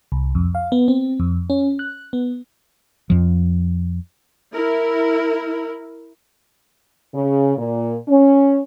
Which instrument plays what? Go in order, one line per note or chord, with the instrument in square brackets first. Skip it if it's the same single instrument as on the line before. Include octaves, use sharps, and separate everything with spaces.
[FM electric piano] C2
F2
F5
B3
C4
F2
C#4
F#6
B3
[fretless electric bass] F2 F3
[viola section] E4 A#4
[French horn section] C#3
A#2
C#4